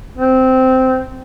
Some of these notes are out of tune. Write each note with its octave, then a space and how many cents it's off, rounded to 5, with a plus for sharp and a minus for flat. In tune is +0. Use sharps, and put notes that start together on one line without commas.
C4 -10